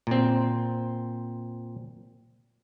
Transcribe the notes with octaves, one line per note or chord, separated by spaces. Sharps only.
A#2 C4